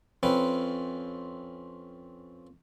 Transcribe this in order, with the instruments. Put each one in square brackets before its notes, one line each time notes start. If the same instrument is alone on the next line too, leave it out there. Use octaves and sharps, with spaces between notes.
[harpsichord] F2 C4 C#4 B4